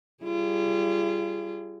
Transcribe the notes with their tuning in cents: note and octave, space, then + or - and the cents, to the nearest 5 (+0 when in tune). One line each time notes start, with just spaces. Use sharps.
G3 -5 F4 -35 G#4 +0